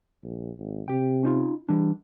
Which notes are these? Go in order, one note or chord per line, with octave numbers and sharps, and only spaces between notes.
A#1
G#1
C3 G4 G5
C#4 D#4 F4
E3 G3 D4